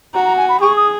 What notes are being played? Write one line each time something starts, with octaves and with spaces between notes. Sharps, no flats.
F#4 A#5
A#5
G#5
B5
G#4 C#6
D#6